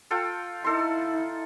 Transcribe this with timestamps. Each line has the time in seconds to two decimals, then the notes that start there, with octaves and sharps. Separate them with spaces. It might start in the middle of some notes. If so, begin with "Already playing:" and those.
0.11 F4 A4 G5
0.64 D#4 E4 A4 C6